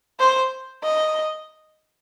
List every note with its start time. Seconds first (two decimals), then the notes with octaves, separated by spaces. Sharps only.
0.19 C5
0.84 D#5